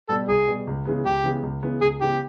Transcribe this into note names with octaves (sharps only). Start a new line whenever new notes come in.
B2 G3 A4
C2 G#4
B2 G3
C#2
C#3 E3 G#3 B3
C#2 G4
C#3 E3 G#3 B3
C#2
C#3 E3 G#3 B3
C#2 G#4
C#3 E3 G#3 B3 G4